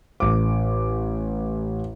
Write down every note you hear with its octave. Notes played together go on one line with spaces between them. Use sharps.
A1 D6